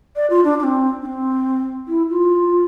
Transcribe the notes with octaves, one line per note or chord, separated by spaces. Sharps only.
D5
F4
D4
D4
C4
D4
C4
E4
F4